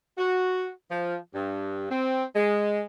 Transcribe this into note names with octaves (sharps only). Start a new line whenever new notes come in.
F#4
F3
G2
C4
G#3